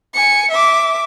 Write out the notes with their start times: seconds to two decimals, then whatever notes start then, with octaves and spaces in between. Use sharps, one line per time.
0.14 G#5 C#7
0.51 E5 D6